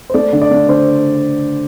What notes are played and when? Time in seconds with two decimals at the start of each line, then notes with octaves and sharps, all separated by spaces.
0.10 C5
0.14 A3 D5
0.33 D3
0.42 D5
0.51 A3
0.68 D3 C5